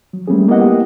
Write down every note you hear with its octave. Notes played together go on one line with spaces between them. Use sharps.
F#3
G3 A3 A#3 C4 C#4 G#4
A#3 B3 E4 G4 D#5 F#5